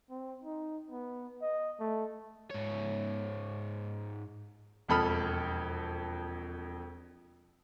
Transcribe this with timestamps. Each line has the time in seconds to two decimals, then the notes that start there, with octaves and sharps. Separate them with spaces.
0.10 C4
0.44 D#4
0.90 B3
1.42 D#5
1.80 A3
2.51 G#2 C#5
4.89 E1 F2 A4 B5 D#6 F6